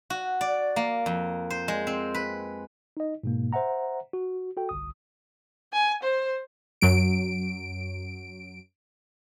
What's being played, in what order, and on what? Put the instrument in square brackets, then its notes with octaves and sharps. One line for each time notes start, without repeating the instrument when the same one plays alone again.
[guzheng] F#4
D5
A#3
F2
C5
G#3
C4
B4
[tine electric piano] D#4 D#5
G#2 B2 A#3
C5 E5 F#5 A#5
F#4
F#4 A4 G5
G1 C2 D#6
[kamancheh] G#5
C5
[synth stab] F#2 F#3 D7